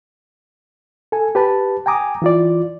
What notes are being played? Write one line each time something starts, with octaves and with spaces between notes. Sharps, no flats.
A4 G#5
G4 B4 A5
G5 G#5 A#5 D6 D#6
E3 F4 D5